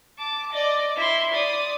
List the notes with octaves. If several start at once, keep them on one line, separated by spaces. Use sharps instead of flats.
A5 D6
D5 D#5
E4 C6
D5 D#6